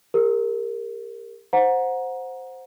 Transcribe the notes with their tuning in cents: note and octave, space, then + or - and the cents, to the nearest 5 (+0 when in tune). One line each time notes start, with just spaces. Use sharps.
G4 +40 A#4 -10
C5 +0 F#5 -20 A#5 +20